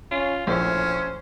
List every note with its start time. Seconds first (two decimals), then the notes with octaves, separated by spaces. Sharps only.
0.11 C#4 F4
0.47 A#1 A2 C#4 C5